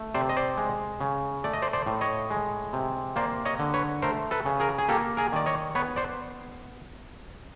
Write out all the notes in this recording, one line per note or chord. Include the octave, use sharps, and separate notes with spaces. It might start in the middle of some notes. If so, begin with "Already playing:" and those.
Already playing: A3
C3 C5 D5
D#5
C5 D5
G#3
C#3
A3 D5
D#5
C5 D5
C5 D5
A2
C#5 D#5
G#3
C3
A#3 C5 D5
C#5 D#5
D3
B4 C#5
A3 A#4 C5
A4 B4
C#3
G#4 A#4
G#4
A#3 G4 A4
G#4 A#4
D#3 D5
C#5 D#5
B3 B4 C#5
C5 D5